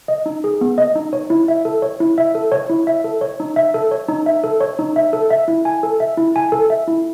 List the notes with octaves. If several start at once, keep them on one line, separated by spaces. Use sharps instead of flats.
D#5
D#4
G#4
B3
D#5
D#4
C#5
E4
E5
A4
C#5
E4
E5
A4
C#5
E4
E5
A4
C#5
D#4
E5
A4
C#5
D#4
E5
A4
C#5
D#4
E5
A4
E5
E4
G#5
A4
E5
E4
G#5
A4
E5
E4